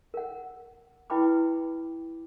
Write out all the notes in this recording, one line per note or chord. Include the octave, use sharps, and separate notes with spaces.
A#4 F#5
E4 B4 G5 B5 D6